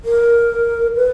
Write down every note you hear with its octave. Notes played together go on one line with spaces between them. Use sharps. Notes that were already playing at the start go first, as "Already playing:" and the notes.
A#4
B4